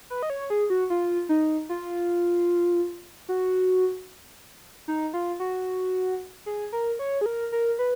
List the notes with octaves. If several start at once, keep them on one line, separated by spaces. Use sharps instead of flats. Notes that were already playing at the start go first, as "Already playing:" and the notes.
B4
D#5
C#5
G#4
F#4
F4
D#4
F4
F#4
D#4
F4
F#4
G#4
A#4
C#5
G#4
A#4
A#4
B4